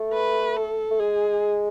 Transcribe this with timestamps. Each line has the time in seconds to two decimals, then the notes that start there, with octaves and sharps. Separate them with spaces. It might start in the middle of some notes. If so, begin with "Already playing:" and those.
Already playing: A3
0.14 B4
0.57 A4
0.91 A3
1.00 G#3 G#4